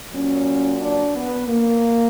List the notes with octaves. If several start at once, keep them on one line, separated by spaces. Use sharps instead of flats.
A#2 F#3 C#4
D4
B3
A#3